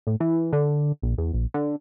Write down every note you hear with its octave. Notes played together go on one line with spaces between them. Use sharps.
A2
E3
D3
A#1
E2
A#1
D3